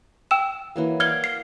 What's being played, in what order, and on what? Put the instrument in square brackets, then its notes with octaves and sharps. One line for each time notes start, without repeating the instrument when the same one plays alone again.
[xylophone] G5 E6 E7
[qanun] E3 F#3 A#3
[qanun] D5 F5 F#5 [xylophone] F6 G#6 G7
[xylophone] C7